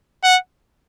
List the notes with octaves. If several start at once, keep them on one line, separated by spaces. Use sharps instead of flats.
F#5